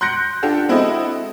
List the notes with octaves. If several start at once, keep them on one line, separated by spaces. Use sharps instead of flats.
C6 F#6 G6 A#6 C#7 D7
D4 F4 G4 A4 F#5
G#3 C4 E4 F#4 A4 D#5